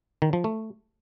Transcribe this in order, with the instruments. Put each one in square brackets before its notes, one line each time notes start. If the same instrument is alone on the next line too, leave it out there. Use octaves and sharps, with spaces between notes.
[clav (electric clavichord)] D#3
F3
A3